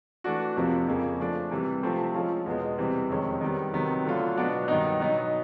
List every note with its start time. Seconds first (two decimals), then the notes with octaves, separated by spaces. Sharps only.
0.24 E3 A3 D4 F#4
0.56 F2 C3 F3 A#3
0.87 F2 C#3 F3 A#3
1.20 F3 A3 D4
1.51 C3 E3 G3
1.83 C3 F3 A3 C4
2.14 F3 G#3 C#4 F4
2.46 E2 B2 G#3
2.78 C3 E3 G3 C4
3.09 F2 C3 D#3 G#3 C#4
3.41 D#3 G3 B3
3.73 C3 D#3 F#3 B3
4.05 D3 F#3 A3 D4 F4
4.36 B2 F#3 B3 D4 F#4
4.68 G2 D#3 F#3 B3 D#4
4.99 B2 F#3 B3 D#4